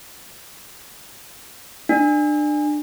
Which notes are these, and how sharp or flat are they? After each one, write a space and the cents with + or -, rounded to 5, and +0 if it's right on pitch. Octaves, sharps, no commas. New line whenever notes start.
D4 +25